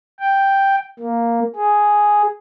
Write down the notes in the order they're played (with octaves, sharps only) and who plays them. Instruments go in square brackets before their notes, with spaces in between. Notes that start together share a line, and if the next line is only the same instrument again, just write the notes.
[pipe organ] G5
A#3
G#4